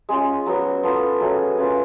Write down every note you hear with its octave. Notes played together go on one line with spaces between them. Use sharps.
G#3 C#4 F4
F#3 B3 F#4
B3 F4 A4
F#3 A3 C#4 G#4
C#4 F4 B4 F5